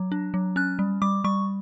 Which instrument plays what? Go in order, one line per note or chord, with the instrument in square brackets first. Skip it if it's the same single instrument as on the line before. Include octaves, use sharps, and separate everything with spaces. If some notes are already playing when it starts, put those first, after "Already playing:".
Already playing: [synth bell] F#3
D4
F#3
C#4 F#6
G3
G3 D6
G3 C#6